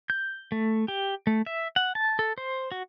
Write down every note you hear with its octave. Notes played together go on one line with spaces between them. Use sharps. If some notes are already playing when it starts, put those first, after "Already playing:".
G6
A3
G4
A3
E5
F#5
A5
A4
C5
F#4